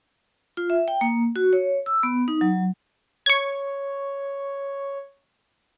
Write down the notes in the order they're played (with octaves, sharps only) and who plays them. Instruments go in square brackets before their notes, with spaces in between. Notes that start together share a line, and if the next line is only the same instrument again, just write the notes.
[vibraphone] F4
E5
G5
A#3
F#4
C#5
E6
B3
D#4
F#3
[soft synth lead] C#5 [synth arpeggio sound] C#6 G#6